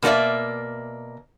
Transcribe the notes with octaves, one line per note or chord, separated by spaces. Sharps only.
B2 A#3 F4 D5 E5